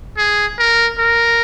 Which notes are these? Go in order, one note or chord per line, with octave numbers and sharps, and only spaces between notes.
G#4
A#4
A#4